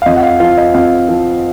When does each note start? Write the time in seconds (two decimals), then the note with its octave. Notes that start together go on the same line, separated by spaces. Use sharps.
0.02 F5
0.06 F2 D#5
0.16 F#5
0.23 F5
0.40 F3 F5
0.57 D#5
0.74 F2 F5
1.09 F3